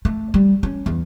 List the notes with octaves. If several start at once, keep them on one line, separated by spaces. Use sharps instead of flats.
A3
G3
C#4
E2